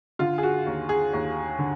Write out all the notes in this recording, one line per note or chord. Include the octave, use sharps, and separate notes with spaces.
D3 F4
G#4
F#4
D#2
G#4
D#2
D3